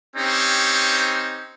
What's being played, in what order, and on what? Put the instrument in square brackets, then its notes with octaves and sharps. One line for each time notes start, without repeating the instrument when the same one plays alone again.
[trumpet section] C4 C#4 D#4 G4